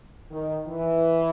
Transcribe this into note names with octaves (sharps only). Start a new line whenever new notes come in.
D#3
E3